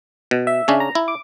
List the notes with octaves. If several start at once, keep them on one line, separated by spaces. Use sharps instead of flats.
B2
E5
C#3 C#4 D4
A#5
E4
D6